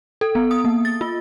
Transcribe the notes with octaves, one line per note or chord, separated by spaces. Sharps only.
A4
B3
D#6
A#3
A6
F4